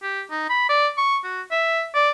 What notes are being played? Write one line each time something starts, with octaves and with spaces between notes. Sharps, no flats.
G4
D#4
B5
D5
C#6
F#4
E5
D5